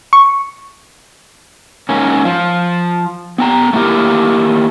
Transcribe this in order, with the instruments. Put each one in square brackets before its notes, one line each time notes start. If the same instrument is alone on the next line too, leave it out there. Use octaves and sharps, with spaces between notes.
[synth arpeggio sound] C#6
[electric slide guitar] G#2 A#3 C#4
F3 F4
B3 G5 A#5
A3 A#3 E4 G4 A#4